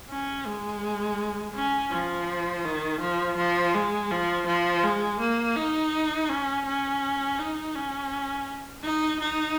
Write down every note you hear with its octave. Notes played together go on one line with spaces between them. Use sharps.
C#4
G#3
C#4
F3
D#3
F3
F3
G#3
F3
F3
G#3
A#3
D#4
C#4
C#4
D#4
C#4
D#4
D#4